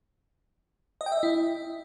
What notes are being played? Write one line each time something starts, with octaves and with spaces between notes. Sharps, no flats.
D#5
G5
E5
D#5
E4